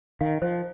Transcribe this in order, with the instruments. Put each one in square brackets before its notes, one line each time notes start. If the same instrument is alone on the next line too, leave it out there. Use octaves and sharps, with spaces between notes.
[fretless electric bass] D#3 [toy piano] F5
[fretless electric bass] F3 [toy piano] C5